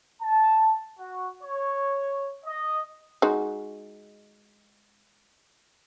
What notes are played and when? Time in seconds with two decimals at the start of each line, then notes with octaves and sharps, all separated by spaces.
0.22 A5
0.99 F#4
1.42 C#5
2.45 D#5
3.22 G#3 D#4 F#4